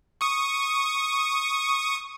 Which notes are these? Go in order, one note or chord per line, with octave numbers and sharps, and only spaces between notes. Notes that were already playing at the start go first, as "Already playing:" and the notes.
C#6 D#6